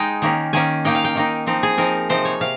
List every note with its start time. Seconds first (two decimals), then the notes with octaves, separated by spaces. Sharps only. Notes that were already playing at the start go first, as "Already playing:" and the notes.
Already playing: G#3 D#4 G5
0.22 D#3 A#3 C#4
0.53 D#3 A#3 C#4 G#5
0.85 D#3 A#3 D#4 G5
0.95 F5
1.04 G5
1.15 D#3 A#3 D#4
1.47 F3 C4 D#4
1.63 G#4
1.78 F3 C4 D#4 A#4
2.09 C3 F3 C4 D#4 C5
2.25 C#5
2.41 C3 F5